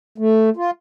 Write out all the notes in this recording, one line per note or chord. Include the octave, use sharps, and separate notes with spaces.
A3
F4